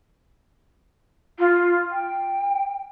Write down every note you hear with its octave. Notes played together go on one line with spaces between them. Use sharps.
F4
G5